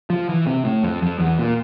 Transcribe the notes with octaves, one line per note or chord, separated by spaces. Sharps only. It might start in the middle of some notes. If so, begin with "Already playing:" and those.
F3
E3
C3
A2
F2
F2
E2
A#2